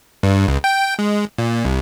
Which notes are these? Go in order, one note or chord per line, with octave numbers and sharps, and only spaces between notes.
G2
C#2
G5
G#3
A#2
C2